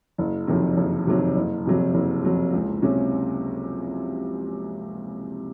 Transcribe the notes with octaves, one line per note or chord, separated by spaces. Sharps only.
F#1
F2 C3 D#3 F#3
F#1
F2 C3 D#3 F#3
F#1
F2 C3 F#3
F#1
F2 C3 F#3
C#2
C3 F#3 C#4